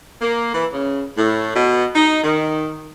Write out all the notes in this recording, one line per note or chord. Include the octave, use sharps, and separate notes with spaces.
A#3
E3
C#3
A2
B2
D#4
D#3